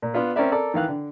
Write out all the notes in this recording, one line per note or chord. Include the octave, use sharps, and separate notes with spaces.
A#2
B3 D4 F4 B4
C4 C#4 A#4 D5 E5
A4 A#4 D5
D#3 E3 F5 F#6
D3